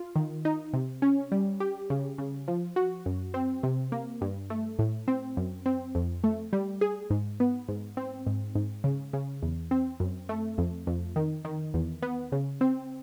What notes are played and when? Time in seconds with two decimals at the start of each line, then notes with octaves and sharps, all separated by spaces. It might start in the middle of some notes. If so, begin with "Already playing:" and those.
Already playing: F4
0.16 D#3
0.45 D#4
0.73 C3
1.02 C#4
1.32 G3
1.60 G4
1.90 C#3
2.18 C#3
2.48 F3
2.76 F#4
3.06 F#2
3.34 C4
3.63 C3
3.92 A#3
4.21 G2
4.50 A3
4.79 A2
5.08 C4
5.37 F#2
5.66 C4
5.95 F2
6.24 A3
6.53 G3
6.81 G#4
7.10 G#2
7.40 B3
7.68 G#2
7.97 C4
8.27 G#2
8.55 G#2
8.84 C#3
9.13 C#3
9.42 E2
9.71 C4
10.00 F#2
10.29 A3
10.58 F2
10.87 F2
11.16 D#3
11.45 D#3
11.74 E2
12.02 B3
12.32 C#3
12.61 C4